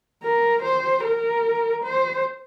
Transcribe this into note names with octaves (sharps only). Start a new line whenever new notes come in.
A#4
C5
A#4
C5